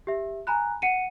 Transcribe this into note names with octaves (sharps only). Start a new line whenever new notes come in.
G4 E5
G#5 A#5 B5 F#6
F#5 C#7 D#7